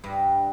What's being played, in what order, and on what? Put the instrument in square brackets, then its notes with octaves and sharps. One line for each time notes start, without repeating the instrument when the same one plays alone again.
[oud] G2